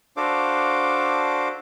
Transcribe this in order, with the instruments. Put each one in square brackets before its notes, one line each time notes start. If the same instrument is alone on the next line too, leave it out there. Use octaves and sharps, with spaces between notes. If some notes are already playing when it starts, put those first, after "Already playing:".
[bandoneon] D4 F#4 A4 C5 F5 D6